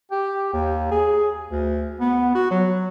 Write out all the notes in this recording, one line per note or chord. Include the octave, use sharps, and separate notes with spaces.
G4
D#2
G#4
D2
B3
F#4
F#3